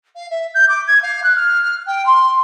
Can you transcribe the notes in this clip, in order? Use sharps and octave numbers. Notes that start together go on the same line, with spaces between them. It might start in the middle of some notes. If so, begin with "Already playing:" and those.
F5
E5
G6
D6
G#6
F5
F#6
F6
G5
C6